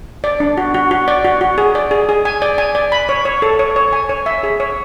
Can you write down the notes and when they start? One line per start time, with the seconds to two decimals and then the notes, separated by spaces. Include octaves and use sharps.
0.24 D5
0.40 D4
0.57 F#4
0.74 F#4
0.91 F#4
1.08 D5
1.25 F#4
1.41 F#4
1.58 G#4
1.75 D5
1.91 G#4
2.09 G#4
2.25 G#5
2.42 D5
2.58 G#5
2.75 D5
2.92 B5
3.09 C#5
3.25 C#5
3.42 A4
3.59 C#5
3.76 C#5
3.93 G#5
4.09 C#5
4.26 E5
4.43 G#4
4.60 C#5